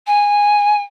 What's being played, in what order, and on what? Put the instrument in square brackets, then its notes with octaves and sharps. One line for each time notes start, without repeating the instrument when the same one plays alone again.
[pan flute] G#5